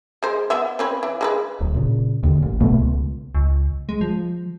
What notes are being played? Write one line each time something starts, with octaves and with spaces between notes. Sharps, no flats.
G#3 C5
B3 E5
C4 C#4 B4
E3
G#3 A4 B4
D1
A#2 C#3
D#2 D3
A1
C2 B2 A3 B3
C#2
C#2
G#3
F3